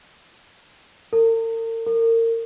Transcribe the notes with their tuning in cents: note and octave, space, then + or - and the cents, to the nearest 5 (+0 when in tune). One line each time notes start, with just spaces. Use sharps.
A#4 -45
A#4 -30